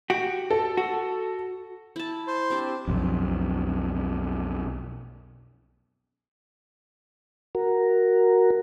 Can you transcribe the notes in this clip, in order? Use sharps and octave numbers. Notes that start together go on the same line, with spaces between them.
F#4 G4
A4
F#4
E4 A5
C5
C4 D4 G4
B1 F2
F#4 A#4